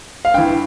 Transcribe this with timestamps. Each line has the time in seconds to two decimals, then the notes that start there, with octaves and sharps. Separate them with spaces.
0.25 F5
0.34 G2 E3 G5